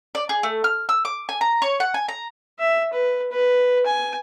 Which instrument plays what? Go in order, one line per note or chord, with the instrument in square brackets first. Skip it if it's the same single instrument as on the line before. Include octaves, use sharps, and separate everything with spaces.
[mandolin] D5
G#4
A3
F6
E6
D6
G#5
A#5
C#5
F#5
G#5
A#5
[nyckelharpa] E5
B4
B4
G#5